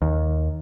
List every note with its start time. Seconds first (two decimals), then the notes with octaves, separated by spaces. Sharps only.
0.02 D#2